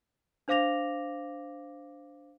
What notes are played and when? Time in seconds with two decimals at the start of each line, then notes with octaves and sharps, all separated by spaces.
0.48 D4 C5 F5 D6 A#6 F7